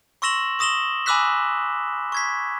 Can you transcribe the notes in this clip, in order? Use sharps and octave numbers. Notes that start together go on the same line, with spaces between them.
C6 C#6 E6 A#6 E7 F#7
C#6 D#6 A#6 E7 F#7 G7
G#5 B5 D6 E6 F#6 B6
C#6 G#6 B6